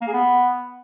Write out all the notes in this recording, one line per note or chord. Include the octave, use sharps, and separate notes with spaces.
A#3
G#4
B3